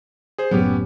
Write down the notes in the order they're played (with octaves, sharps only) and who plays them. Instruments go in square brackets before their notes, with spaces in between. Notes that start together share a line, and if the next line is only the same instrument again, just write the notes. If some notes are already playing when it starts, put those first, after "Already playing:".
[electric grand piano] G#4 C5
[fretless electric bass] F#1 A2 F#3 [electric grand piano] B3 C#4 G4